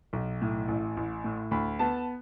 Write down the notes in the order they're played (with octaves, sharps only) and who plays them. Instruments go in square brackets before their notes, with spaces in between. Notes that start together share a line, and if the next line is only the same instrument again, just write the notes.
[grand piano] B1
A2
A1
A1
A2
D2 B5
B3 A5